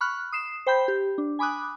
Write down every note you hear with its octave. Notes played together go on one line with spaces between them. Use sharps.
B5 C#6 F6 F#6
D#6 C7 E7
C5 G5 B5 G6
G4
D4
G#5 B5 D6 D#6 F#6